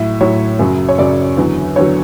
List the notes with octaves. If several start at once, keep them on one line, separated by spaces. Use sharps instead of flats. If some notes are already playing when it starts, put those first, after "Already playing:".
Already playing: A2 F#3 E5
A2 F#3 C#5
F#2 C#3 F#3
C#5
F#2 C#3 F#3 D5
E2 D3 F#3
E2 D3 F#3 C#5